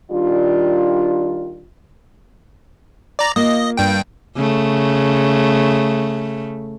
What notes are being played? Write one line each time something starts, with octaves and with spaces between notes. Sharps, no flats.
D#3 G3 D4 F4
D5 A#5
A#3 F4 D#5
G2 G5
C#3 A3